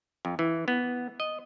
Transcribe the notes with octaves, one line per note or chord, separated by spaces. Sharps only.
F2
E3
B3
D#5